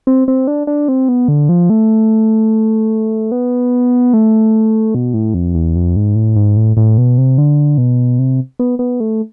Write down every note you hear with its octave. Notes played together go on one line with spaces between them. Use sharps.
C4
C4
D4
D4
C4
B3
D3
F3
A3
B3
A3
B2
A2
F2
E2
F2
G#2
A2
G#2
A2
A2
B2
C3
D3
B2
C3
B3
B3
A3